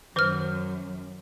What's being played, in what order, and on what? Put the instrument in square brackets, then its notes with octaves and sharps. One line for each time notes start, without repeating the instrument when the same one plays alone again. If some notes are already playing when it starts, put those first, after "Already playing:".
[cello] F#2 [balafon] D#3 B4 [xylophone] C5 F6